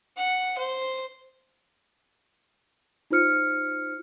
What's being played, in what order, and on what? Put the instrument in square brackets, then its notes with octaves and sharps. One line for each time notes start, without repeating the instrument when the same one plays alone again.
[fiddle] F#5
C5
[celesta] D#4 F4 C5 F6 C#7